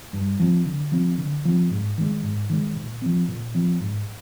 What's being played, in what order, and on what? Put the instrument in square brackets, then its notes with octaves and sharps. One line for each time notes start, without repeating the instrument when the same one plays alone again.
[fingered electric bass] G2
F3 C4
D3
F3 C4
D3
F3 C4
G#2
D#3 G#3
G#2
D#3 G#3
A#2
F3 C4
A#2
F3 C4
G#2